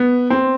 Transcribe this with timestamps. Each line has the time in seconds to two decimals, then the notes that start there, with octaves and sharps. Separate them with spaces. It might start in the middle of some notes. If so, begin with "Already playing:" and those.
Already playing: B3
0.30 C4